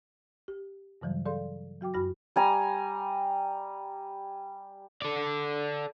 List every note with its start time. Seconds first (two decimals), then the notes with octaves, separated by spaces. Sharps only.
0.48 G4
1.01 G2 C#3 E3 F#3 G3
1.25 G#4 A4 D5 F5 C6
1.81 F#3 F#4 G5 D6
1.94 F#2 F#4 B5 A#6
2.36 G3 G#5 A#5
5.02 A4 D5